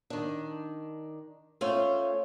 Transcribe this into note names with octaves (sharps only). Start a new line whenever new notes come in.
D#3 D4
A3 C#4 F4 C5 C#5